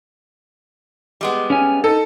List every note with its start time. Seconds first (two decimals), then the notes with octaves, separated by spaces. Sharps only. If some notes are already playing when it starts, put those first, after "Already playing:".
1.21 G3 G#3 B3
1.50 C#4 F5 G#5
1.84 D#4 A4